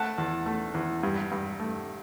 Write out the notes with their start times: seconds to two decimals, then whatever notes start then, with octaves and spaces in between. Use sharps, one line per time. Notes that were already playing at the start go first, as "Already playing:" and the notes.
Already playing: A3 F#5 A5
0.18 E2
0.46 A3
0.74 E2
1.03 G2
1.31 G2
1.60 A3